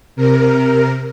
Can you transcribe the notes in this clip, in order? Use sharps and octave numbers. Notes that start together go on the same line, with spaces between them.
C3 A#4